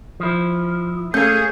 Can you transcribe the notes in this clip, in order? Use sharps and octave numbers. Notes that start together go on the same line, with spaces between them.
F3 E4
A3 A#3 C#4 G#4 G6